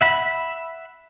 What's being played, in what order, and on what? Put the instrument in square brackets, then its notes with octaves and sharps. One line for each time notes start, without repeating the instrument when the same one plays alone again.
[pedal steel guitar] E5 F#5 B5